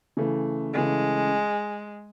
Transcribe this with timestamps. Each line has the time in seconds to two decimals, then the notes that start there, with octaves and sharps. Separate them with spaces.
0.17 C#3 E3 A3
0.73 C#3 E3 G#3 A3